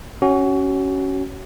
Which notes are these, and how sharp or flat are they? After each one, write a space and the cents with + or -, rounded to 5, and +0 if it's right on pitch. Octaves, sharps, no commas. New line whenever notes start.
C#4 +0 F#4 +30